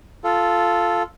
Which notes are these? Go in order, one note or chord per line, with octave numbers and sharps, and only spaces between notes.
F4 A4